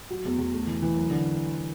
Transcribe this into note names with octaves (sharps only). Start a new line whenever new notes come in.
F#3
E2
E2
A3
E3
E3
F#2
D3